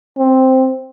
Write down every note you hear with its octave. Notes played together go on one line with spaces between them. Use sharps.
C4